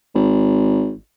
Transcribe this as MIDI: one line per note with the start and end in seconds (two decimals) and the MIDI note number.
0.15 0.93 32